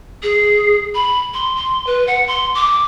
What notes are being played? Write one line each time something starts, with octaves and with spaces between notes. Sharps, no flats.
G#4
B5
C6
C6
B4
F#5
C6
D6